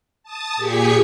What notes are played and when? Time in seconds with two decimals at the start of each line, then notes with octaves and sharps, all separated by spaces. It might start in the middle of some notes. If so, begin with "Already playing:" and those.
0.23 A5 D#6 A6
0.57 A#2 G4 G#4 G#6 B6 C#7